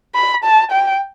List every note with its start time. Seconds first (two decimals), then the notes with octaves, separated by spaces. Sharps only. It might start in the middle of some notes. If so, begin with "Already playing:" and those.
0.15 B5
0.44 A5
0.72 G5